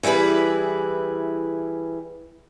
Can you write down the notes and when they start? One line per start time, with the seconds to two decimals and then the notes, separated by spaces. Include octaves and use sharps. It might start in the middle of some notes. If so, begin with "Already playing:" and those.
0.03 E3 G3 E4 G#4 B4